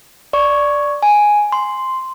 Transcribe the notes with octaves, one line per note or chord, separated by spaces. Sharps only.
D5 C#6
G#5
C6